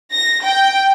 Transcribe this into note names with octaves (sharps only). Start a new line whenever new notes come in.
A#6
G5